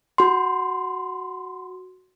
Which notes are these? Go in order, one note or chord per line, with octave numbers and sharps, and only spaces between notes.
F#4 C6